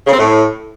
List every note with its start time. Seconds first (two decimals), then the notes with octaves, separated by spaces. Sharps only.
0.06 C#3
0.13 C4
0.19 A2